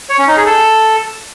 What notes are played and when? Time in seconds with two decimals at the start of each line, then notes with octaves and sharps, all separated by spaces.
0.09 C#5
0.19 C#4
0.28 D#4
0.37 G#4
0.46 A4